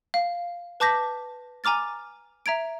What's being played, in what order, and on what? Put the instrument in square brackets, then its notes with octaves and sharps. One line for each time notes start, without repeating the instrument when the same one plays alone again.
[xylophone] F5
B4 A5 D6 G6 A#6 B6
G#5 A#5 D6 F6 A6
E5 A#5 G#6 D7